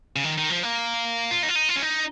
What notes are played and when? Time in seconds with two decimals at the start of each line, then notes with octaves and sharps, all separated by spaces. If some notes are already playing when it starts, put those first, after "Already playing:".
0.16 C#3
0.24 D#3
0.38 D#3
0.50 F3
0.63 A#3
1.31 F4
1.43 D#4
1.49 F4
1.56 D#4
1.69 F4
1.76 C#4
1.82 D#4